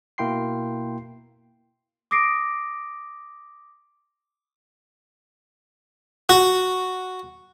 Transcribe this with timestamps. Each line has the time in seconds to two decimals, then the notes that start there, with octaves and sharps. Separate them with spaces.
0.18 B2 A#3 E4 G5 C6 C7
2.11 D6 D#6 A#6 C7 D7
6.29 F#4